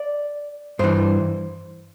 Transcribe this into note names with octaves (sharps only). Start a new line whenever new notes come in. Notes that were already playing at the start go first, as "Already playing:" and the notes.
Already playing: D5
G2 E3 C5